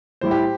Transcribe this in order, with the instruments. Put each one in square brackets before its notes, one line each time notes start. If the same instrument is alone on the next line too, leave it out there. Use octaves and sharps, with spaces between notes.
[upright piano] A2 G3 E4 [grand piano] C5
[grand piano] G4